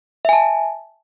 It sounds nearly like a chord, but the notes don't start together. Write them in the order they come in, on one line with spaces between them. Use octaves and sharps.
E5 G#5 A5